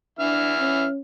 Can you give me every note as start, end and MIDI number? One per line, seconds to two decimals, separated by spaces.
0.19 0.85 52
0.19 0.54 62
0.19 0.85 76
0.19 0.85 89
0.60 1.01 61